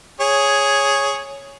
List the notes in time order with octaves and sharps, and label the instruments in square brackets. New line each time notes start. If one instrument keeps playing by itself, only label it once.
[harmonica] G#4 C#5